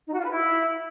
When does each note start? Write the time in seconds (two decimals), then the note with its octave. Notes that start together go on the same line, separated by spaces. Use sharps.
0.07 D#4
0.13 F#4
0.18 F4
0.24 B4
0.30 E4